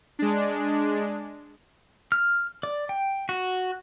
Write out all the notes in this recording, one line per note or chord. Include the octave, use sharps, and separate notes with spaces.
G#3 D4
F6
D5
G5
F#4